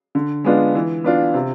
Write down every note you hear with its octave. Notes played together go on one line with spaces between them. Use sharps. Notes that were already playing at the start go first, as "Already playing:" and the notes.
D3
G#3 B3 D4 F4
E3
B3 D4 F4
C3